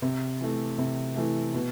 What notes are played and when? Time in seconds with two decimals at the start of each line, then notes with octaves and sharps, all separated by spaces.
0.02 C3
0.41 E3 A3
0.78 C3
1.16 E3 A3
1.54 B2